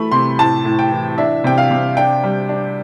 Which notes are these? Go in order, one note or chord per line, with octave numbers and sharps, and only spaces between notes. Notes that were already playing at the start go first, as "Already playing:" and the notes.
Already playing: E3 A3 B5
C3 C6
A2 A5
A2
G5
E3
D4 E5
C3 G5
F5
C3
D4 G5
G3
D4